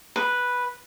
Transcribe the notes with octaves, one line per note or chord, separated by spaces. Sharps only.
B4